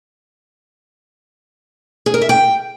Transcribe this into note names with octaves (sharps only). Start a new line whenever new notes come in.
G#4
A#4
E5
G5